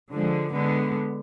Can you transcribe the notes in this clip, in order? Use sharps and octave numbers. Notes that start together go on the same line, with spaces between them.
D3 F3 G#3
D3 G#3 B3